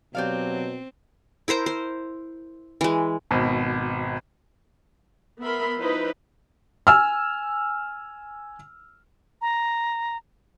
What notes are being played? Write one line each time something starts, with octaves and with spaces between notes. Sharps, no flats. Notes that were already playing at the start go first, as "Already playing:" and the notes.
B2 F#3 C4 G4 D5 F5
E4 A#4 C5 A#5
C5
E3 G#3
G#1 B2
B3 A#4 E5 B5 C6
F3 D#4 E4 B4 C5
G#5 E6 F6
A#5